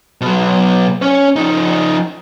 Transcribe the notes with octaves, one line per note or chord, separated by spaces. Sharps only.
B2 F#3
C#4 C#5
F3 D#4